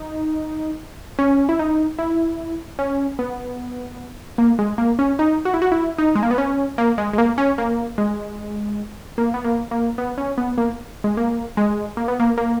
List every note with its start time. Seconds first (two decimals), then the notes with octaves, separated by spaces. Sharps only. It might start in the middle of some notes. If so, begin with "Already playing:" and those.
Already playing: D#4
1.19 C#4
1.49 E4
1.59 D#4
1.99 E4
2.79 C#4
3.19 B3
4.38 A#3
4.59 G#3
4.78 A#3
4.99 C#4
5.19 D#4
5.45 F#4
5.54 E4
5.62 F#4
5.72 E4
5.98 D#4
6.15 G#3
6.23 A#3
6.31 B3
6.38 C#4
6.78 A#3
6.98 G#3
7.13 G#3
7.18 A#3
7.38 C#4
7.58 A#3
7.98 G#3
9.18 A#3
9.34 B3
9.44 A#3
9.71 A#3
9.98 B3
10.18 C#4
10.38 B3
10.58 A#3
11.04 G#3
11.17 A#3
11.57 G#3
11.97 A#3
12.08 B3
12.20 A#3
12.38 A#3